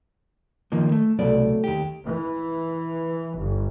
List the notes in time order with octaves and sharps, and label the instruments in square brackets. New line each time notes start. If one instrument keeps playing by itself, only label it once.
[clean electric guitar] D#3 F3 A#3
A3
[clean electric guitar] C2 B2 D5 [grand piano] F#3 A3
[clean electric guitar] D#2 G4
[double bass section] E3
G1